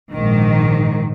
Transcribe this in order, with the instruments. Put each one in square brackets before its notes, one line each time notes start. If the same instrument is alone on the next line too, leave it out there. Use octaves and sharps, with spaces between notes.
[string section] A#1 G#2 D#3